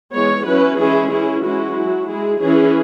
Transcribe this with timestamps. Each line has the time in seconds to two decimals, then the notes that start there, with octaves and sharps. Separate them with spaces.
0.13 E3 G#3 B3 C#5
0.46 F#3 C#4 E4 B4
0.79 E3 G#3 C#4 E4 G#4
1.12 E3 C#4 E4 G#4
1.44 E3 G#3 C#4 E4 F#4
1.77 F#3 E4
2.09 G#3 E4 G#4
2.42 E3 C#4 E4 G#4